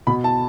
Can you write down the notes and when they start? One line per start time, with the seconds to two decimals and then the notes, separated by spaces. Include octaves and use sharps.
0.07 B2 B5
0.24 A5